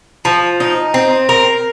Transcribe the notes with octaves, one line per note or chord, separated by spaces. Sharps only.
F3
D#4
C4
A#4